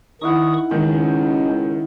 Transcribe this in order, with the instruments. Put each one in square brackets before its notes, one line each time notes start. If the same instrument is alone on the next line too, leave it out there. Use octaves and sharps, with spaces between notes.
[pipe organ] D#3 C#6 D#6 [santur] D#4 E4 F#5
[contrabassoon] C#2 [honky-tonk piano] D#3 [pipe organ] G#3 C#4